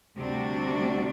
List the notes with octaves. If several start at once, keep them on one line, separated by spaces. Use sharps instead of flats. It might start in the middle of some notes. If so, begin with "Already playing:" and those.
D2 C3 G3 D4 F#4